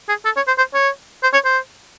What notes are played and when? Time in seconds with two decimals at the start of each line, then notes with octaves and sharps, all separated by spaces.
0.09 G#4
0.25 A4
0.36 C#5
0.47 C5
0.58 C5
0.74 C#5
1.23 C5
1.33 C#5
1.45 C5